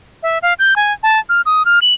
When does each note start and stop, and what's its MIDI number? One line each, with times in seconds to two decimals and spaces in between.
0.23 0.38 76
0.42 0.53 77
0.59 0.74 91
0.76 0.93 80
1.03 1.19 81
1.29 1.42 89
1.46 1.65 87
1.65 1.79 89
1.82 1.94 102